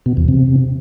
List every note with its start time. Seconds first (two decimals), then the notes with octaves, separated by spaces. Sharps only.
0.06 B2
0.17 E2
0.28 C3